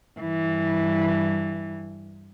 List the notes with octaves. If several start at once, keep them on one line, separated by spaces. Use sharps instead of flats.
G2 E3